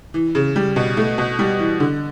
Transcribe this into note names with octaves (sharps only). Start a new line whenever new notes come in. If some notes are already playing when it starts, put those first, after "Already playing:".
E3
C#3
G3
B2
A3
B2
G3
E3
D3